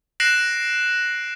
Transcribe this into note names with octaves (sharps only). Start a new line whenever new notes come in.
F#6 A#6 C7 D7 E7 F#7